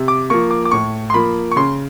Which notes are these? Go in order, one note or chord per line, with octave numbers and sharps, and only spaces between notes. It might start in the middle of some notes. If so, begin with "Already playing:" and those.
Already playing: C3
D6
F3 A#3 C#6
D6
D6
A2 C#6
C6
F3 A#3 B5
C#6
C#3 C6